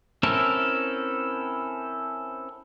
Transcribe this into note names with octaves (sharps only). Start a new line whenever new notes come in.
C4 C#4 E4 A4 A#4